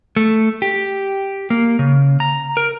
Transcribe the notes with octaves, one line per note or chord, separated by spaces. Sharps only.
A3
G4
A#3
C#3
A#5
A#4